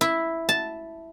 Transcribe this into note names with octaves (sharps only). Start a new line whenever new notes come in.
E4
A5